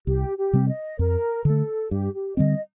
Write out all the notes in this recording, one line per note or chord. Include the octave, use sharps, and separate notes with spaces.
C2 G4
G4
C3 G3 C4
D#5
F2 A#4
D3 A3 A4
G2 G4
G4
D3 G3 C4 D#5